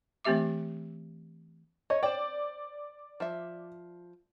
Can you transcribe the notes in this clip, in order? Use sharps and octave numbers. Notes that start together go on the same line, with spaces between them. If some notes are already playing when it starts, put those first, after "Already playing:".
E3 A3 C4 G4 E5 D6
C#5 D#5
C5 D5 G5
F3 E5